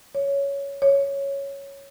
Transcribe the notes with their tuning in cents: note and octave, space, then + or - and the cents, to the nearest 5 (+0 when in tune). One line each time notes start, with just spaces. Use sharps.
C#5 +10
C#5 +0